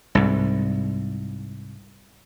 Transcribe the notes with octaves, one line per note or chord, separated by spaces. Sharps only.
C2 G#2